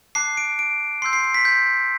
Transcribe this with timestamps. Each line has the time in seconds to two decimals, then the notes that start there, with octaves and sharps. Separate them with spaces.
0.15 A5 D6 F#6 C7
0.37 D7
0.59 D7
1.02 C6 E6 G6 C7
1.13 C7
1.24 C7
1.34 B6
1.45 G6